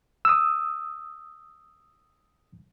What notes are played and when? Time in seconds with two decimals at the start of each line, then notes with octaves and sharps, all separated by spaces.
0.25 D#6 E6